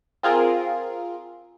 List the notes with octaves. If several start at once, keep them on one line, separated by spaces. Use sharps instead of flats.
C4 F4 G#4 A#4